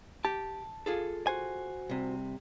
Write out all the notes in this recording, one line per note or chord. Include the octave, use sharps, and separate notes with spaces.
G4 A5
F4 G#4 A4
F#4 C5 G#5
C2 C3